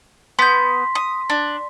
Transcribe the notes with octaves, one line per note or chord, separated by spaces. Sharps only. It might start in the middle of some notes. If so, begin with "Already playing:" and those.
B3 C6 G6 B6
D#6
D4